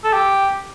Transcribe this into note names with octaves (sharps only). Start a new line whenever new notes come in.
A4
G4